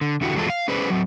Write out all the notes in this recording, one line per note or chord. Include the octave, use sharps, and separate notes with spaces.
D3
E2 D3 E4 F#4 G4
E2 F#3 G#3 F4 A4
F5
C#4 G#4 B4 C5 D5
F#3 C4